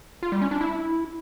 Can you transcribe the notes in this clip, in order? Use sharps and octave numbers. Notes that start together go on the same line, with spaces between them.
F4
G3
C#4
D4
E4